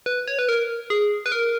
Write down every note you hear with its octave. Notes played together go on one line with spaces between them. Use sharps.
B4
C#5
B4
A#4
G#4
B4
A#4